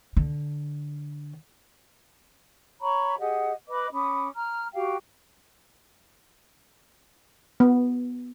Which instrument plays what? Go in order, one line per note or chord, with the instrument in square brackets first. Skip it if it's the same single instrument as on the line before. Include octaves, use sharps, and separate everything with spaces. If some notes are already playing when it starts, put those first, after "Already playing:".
[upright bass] D3
[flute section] C#5 A#5 B5 C#6
G4 G#4 D#5 F#5
B4 D#5 B5 D6
C#4 B5 D6 D#6
A#5 F6
F#4 G4 F5 G5
[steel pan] B3